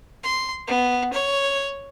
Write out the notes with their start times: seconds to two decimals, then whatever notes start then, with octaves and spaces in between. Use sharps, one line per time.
0.23 C6
0.67 B3
1.13 C#5